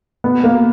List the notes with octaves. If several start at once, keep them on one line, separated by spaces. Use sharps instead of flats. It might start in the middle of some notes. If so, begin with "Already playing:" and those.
B3
A#3